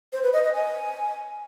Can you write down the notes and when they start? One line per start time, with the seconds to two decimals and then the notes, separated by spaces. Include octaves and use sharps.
0.13 C5
0.23 B4
0.33 D#5
0.43 D#5
0.54 G#5